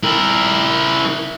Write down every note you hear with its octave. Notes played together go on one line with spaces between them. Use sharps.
E4 A#4